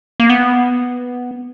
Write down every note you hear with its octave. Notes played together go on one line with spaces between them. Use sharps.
A#3
B3